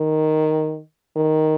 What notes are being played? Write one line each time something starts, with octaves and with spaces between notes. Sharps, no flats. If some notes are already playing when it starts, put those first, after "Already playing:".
Already playing: D#3
D#3